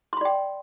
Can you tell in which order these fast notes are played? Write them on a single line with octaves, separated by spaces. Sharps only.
C6 B5 D5 G5